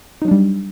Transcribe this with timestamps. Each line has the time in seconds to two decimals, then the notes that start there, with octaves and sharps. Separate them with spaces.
0.22 D#4
0.25 F#3
0.28 D4
0.31 G3